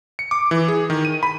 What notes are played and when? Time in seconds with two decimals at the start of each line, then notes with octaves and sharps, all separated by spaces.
0.19 C#7
0.31 D6
0.51 E3
0.68 G#4
0.90 D#3
1.05 D#7
1.23 B5